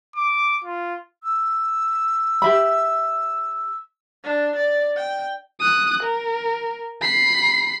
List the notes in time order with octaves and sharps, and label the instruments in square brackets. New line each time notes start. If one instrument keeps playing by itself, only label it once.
[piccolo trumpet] D6
F4
[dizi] E6
[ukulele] G4 E5 B5
[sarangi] D4
D5
G5
[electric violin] D#6 F#6
A#4
B5 C7